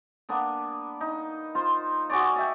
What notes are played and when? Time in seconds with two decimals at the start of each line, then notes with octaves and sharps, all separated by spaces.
0.29 A#3 B3 D4
1.01 D#4
1.55 F4 C5
2.10 F#4 G#4 C#5 D5
2.36 D5 E5 G5